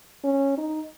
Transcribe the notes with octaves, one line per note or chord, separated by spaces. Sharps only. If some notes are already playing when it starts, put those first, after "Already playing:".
C#4
D#4